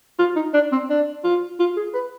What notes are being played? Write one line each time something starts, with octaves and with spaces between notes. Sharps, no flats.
F4
D#4
D4
C4
D4
F4
F4
G#4
B4